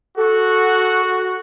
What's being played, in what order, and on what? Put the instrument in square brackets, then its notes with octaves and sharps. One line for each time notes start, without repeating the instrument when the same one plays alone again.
[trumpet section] F#4 [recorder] A4